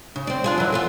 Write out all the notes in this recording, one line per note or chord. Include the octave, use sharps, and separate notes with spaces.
C#3
C4 D5
D4 F4 G#4
E3 F#3
A3 B3 F4